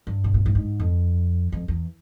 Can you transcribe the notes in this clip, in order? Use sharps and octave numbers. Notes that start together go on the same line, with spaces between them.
G2
B2
A#2
A2
G#2
F2
F2
E2